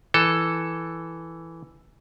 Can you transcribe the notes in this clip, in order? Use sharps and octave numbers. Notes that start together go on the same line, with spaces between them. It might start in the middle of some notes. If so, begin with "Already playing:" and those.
E3 A4